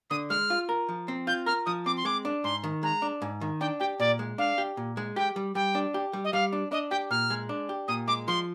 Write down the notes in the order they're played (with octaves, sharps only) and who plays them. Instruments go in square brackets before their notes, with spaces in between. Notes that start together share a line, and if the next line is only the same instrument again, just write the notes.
[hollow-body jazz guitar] D3 [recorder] D#6
[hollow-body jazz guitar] G#3 [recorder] F6
[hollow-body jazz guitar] F4
A#4
F3
C4
[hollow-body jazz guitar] F4 [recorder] G6
[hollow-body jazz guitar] A#4 [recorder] F6
[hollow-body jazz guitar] F3 [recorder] D#6
[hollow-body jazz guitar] C4 [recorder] D6
[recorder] C6
[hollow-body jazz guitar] G#3 [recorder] D6
[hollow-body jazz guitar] D4
[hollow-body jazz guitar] G#2 [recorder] C6
[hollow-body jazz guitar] D#3
[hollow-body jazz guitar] G#3 [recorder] A#5
[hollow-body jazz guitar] D4
G#2
D#3
[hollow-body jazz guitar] D4 [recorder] G5
[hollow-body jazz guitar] G4 [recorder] G5
[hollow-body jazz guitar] A#2 [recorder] D5
[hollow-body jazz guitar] G#3
[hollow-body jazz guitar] D4 [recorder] F5
[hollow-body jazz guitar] G4
A#2
G#3
[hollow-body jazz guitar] G4 [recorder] G5
[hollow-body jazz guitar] G3
[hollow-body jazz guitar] G3 [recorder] G5
[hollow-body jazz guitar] D4
G4
G3
[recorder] D#5
[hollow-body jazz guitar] G3 [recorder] F5
[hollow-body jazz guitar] D4
[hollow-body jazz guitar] D4 [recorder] D#5
[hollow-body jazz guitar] G4 [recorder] G5
[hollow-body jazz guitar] A#2 [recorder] F6
[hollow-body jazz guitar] G#3
D4
G4
[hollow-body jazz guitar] A#2 [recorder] D#6
[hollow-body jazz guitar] G#3 [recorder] D6
[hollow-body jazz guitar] F3 [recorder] C6